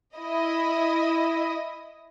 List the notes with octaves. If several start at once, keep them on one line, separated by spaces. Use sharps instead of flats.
E4 D#5